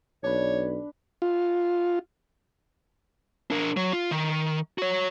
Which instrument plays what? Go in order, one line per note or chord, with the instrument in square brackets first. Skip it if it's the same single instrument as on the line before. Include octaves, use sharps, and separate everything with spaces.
[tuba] B1 [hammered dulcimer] D4 B4 [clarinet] C#5
[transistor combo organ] F4
[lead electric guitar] D4 A#4
F#3
F4
D#3
F#4 C#5